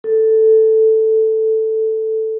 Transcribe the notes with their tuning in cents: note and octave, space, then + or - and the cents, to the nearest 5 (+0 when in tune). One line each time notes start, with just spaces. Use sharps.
A4 +5